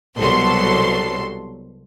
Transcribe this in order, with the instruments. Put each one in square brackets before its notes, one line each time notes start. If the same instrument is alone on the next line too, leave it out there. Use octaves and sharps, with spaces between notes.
[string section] C2 B2 F#3 A4 C6